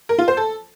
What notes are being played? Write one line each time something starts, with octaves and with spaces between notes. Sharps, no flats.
A#4
F4
C5
A4